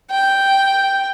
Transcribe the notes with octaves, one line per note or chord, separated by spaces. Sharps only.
G5